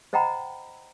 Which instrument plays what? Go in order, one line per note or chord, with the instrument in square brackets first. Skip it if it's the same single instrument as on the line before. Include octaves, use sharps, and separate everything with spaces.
[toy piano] C5 D#5 F#5 G5 A#5 B5